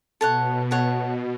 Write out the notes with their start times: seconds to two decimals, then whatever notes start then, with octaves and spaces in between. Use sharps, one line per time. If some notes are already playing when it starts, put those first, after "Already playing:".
0.21 B2 A4 C#5 F#5
0.71 A4 C#5 F#5